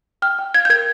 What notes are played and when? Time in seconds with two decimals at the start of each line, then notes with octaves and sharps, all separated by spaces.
0.22 G5 F6
0.39 G5
0.54 F5 G#6
0.65 G6
0.70 A#4 G#6